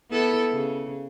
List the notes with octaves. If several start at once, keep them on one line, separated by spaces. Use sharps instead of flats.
B3 E4 A4
C#3